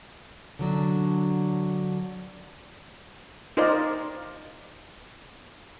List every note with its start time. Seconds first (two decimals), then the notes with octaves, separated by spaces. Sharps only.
0.59 D3 F#3 D4
3.57 D#4 F4 A#4 C5 D5